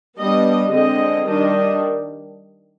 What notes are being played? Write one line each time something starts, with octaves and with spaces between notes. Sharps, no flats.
G3 B3 D4 D#5
D3 G#3 C4 D#5
D#3 G3 D4 D#5